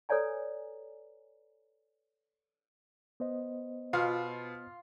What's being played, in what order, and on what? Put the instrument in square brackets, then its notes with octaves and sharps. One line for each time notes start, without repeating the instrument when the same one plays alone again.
[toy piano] A4 B4 C#5 D5 G#5 A#5
[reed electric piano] B3 C5 D#5
[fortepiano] B2 F5 [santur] F4